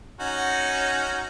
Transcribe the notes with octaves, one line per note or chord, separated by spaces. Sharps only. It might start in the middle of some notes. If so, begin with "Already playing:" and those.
C#4 D#4 F#4